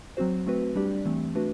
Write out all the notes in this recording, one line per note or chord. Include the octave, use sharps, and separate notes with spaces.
F#3 C4 F#4 C5
A3 C4 F#4 B4
G3 D4 G4 D5
E3 A3 C4
A3 D4 F#4 B4